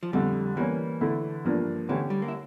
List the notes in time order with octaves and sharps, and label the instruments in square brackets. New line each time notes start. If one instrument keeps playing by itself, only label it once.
[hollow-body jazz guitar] F3
[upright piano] F2 D3 A3 [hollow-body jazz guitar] G3
[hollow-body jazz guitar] E3 [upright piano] G3 A#3 C#4
[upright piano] D3 A3 E4 A4
G2 F3 A#3 D4
[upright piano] D3 A3 C#4 G4 C#5 [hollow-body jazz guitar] E3
[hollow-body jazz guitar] G3
A#3
E4